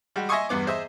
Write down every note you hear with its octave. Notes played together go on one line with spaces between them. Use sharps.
G3 G#3 F#4
D#5 E5 G#5 C6 C#6 D#6
E2 G2 B3 D6
G#4 C5 D#5 E5